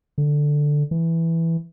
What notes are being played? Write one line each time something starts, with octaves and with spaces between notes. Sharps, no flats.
D3
E3